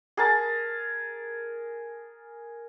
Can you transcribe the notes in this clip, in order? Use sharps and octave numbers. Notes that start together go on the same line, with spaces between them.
G#4 A#4 A5